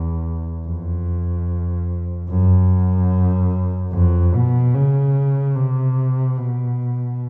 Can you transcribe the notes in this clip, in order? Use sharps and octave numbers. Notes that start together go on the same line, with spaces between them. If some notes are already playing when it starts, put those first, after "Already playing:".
Already playing: E2
F2
F#2
F2
B2
C#3
C3
B2